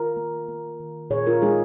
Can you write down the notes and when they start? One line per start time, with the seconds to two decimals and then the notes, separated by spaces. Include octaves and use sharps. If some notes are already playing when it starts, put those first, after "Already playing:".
Already playing: D#3 F4 A#4
0.17 A#3
0.48 A#3
0.80 D#3
1.10 A#2 G#4 C#5
1.26 F4 A#4
1.42 G#3 D#4 G#4